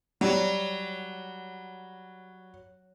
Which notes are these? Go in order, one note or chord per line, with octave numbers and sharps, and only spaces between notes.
F#3 G3